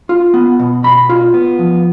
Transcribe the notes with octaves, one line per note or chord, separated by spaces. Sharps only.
F4
B3
B2
B2 B5
F4
B3
F3